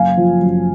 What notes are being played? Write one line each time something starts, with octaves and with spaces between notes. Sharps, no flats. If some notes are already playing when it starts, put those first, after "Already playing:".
Already playing: F#1 F5 G#5
F3
F#2